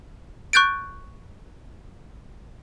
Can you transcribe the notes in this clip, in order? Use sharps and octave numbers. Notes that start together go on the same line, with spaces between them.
C#6 F#6 G6 A6 D7